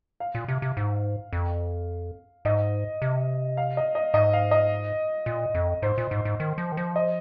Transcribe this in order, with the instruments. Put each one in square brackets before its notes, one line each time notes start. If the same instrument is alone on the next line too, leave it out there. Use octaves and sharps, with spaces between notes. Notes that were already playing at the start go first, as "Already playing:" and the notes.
[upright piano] F5
[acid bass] A#2
C3
C3
G#2
F2
[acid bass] G#2 [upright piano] D#5
[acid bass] C3
[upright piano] F5
D#5
D#5
[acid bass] G#2 [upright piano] D#5
[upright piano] F5
D#5
[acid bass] A#2
F2
[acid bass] G#2 [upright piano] C5
[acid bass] A#2
G#2
G#2
D#3
F3
D#3
F3
[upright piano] D#5